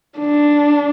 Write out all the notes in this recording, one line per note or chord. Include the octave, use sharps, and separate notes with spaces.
D4